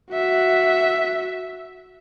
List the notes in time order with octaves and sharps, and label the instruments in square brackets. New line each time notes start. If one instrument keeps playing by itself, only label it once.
[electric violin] F#4 E5